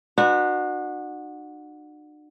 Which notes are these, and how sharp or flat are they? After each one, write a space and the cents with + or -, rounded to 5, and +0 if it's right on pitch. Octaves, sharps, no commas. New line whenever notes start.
D4 +45 F#4 -15 B4 +0